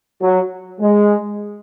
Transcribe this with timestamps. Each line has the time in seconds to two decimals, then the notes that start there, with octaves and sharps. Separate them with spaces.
0.21 F#3
0.80 G#3